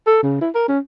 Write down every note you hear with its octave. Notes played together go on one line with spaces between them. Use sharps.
A4
C#3
E4
A#4
C#4